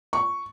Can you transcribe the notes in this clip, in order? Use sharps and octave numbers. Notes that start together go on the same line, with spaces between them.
C#6